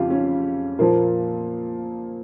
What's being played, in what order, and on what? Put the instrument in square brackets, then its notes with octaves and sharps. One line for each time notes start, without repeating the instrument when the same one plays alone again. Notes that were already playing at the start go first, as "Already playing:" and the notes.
Already playing: [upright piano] F2 C#3 F4 G4
C#4
A#2 F3 A#3